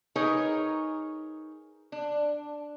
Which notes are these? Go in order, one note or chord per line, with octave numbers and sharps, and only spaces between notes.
D#4 G#4 A#4 B4 C#5
D4